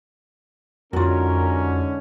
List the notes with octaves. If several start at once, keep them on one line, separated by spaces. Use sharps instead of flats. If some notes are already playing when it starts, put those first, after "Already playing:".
F2 G#2 D3 C#4 F4 F#4 A#4